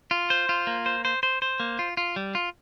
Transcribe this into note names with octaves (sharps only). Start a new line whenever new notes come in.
F4
C5
F4
A#3
C5
C5
C5
C5
A#3
F4
F4
G3
F4